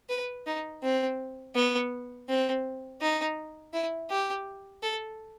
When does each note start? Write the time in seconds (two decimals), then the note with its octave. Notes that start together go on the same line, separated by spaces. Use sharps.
0.09 B4
0.46 D#4
0.83 C4
1.55 B3
2.28 C4
3.01 D#4
3.73 E4
4.10 G4
4.83 A4